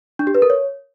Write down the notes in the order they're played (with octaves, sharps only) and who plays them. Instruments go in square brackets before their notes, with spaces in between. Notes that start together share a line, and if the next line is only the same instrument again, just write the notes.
[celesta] D4
G4
B4
A#4
C#5